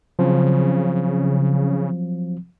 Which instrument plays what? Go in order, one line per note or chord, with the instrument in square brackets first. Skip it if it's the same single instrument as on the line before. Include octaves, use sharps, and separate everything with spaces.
[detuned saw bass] C#3 [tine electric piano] F3 F#3 C4